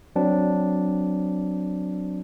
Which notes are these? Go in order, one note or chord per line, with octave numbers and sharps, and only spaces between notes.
F#3 C4 D4